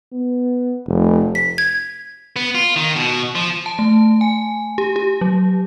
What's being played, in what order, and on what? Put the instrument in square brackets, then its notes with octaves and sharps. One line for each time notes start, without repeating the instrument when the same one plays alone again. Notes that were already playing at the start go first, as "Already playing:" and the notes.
[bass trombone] B3
F1
[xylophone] B6
G#6
[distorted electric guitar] B3
F4
D#3
B2
F3
[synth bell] A5
A3
G#5
G4
G4
F#3